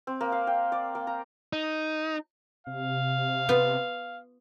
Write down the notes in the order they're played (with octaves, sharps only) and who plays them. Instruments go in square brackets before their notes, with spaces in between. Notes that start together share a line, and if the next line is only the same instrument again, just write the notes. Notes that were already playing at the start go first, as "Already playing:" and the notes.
[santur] C4
A#3
F5
G5
D5
A#3
A#5
[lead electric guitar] D#4
[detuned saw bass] C3 [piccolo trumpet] F5
[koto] B3 F4